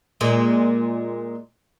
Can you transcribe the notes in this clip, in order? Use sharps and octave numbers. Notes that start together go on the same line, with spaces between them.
A#2 G#3